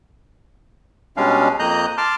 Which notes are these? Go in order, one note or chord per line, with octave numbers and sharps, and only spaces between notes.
B2 G3 G#3 C#4 D4 F5
F2 A#3 D#5 A#5 F#6 G6
A5 C6 D6 F6